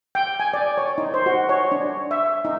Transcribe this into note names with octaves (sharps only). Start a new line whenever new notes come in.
G5
G#5
D5
C#5
D#4
C5
F#4
C#5
D4
E5
D#4